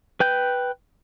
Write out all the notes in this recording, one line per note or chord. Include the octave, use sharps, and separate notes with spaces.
B4 G5 G6